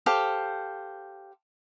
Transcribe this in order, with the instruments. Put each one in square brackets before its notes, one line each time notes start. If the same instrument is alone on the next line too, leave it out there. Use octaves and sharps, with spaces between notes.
[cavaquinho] G4 A4 C5 F5